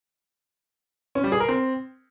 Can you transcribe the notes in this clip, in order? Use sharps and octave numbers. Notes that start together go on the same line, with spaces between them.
C#4
G3
G#4
A#4
C4